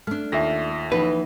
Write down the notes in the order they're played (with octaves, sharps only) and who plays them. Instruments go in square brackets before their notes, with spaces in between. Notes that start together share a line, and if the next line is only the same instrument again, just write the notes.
[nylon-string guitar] A3 D4 [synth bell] F6
[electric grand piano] D#2 A4 A#6 [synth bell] F4 E5
[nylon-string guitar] E3 [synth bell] F3 A#3 D#4 [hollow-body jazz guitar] B4